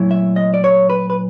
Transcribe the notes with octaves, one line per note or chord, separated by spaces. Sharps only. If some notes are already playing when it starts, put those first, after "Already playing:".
Already playing: A#2 F#3 A3 E4
E5
D#5
D5
C#5
B4
B4